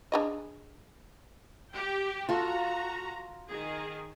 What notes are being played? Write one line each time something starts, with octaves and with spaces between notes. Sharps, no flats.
D4 G#4 D#5
G4 G5
F4 F#4 A4 A#5
D#3 G#4